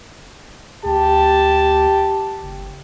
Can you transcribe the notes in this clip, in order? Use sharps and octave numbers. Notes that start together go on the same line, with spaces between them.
D2 G4 A5
F#1